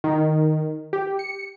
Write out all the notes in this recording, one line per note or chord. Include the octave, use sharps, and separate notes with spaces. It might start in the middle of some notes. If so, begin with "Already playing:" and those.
D#3
G4
C#7